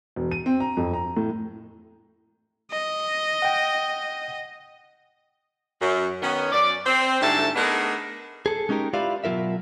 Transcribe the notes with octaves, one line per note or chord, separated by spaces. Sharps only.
E1
D#7
C4
A#5
F2
A#5
A2
D#5
F#5 G5
F#2
D#3 B3 C#4
F#2 D5
C4
G#2 D3 G3 A3 E4 A5
A3 B3 D4 D#4 G#4 A#4
G#4 A4
G#3 C#4 D#4 G4 A#4
E4 F4 G4 B4 D5 F5
B2 F#3 F4 A#4 E5